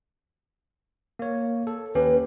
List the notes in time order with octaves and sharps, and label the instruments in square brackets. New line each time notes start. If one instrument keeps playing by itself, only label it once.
[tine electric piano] A#3 C#5
A4
[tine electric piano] D#2 C#4 G4 [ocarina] B4